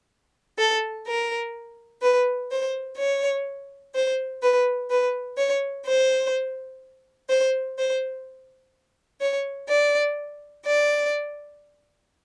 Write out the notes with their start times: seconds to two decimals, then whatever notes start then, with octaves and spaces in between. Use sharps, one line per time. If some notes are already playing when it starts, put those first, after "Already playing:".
0.58 A4
1.06 A#4
2.02 B4
2.51 C5
2.98 C#5
3.94 C5
4.42 B4
4.90 B4
5.37 C#5
5.86 C5
7.29 C5
7.77 C5
9.21 C#5
9.69 D5
10.65 D5